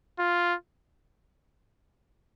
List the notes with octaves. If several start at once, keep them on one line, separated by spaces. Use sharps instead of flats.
F4